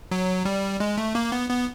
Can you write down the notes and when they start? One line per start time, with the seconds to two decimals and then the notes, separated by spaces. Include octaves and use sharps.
0.11 F#3
0.45 G3
0.80 G#3
0.98 A3
1.15 A#3
1.32 B3
1.50 B3